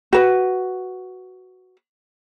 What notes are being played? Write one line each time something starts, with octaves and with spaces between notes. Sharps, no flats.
F#4 B4